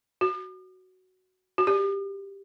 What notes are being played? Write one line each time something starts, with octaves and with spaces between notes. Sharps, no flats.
F#4
F#4
G4